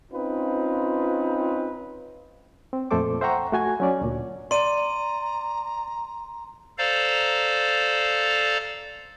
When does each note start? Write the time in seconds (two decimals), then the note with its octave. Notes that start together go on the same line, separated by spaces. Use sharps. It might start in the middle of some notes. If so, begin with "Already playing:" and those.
0.12 C4 C#4 D#4 F4 B4
2.73 C4
2.91 F2 A#2 A3 A4 C5 D6
3.21 C5 E5 F#5 G5 A#5 C#6
3.52 A3 F#4 G#5 G#6
3.80 F#3 C#4 D5
4.01 D2 A#2
4.51 D5 A#5 C6 D#7
6.78 A4 C5 D5 F5 A#5